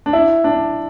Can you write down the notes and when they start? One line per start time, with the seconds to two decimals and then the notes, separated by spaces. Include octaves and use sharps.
0.06 D4
0.13 E4
0.44 D4